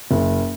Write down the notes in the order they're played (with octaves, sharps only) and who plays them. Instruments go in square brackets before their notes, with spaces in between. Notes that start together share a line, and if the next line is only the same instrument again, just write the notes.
[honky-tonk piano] F#1